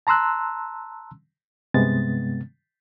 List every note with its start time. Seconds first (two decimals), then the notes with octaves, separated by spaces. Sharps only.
0.07 A5 A#5 C6 E6 F#6
1.74 G2 C3 G#3 B3 A6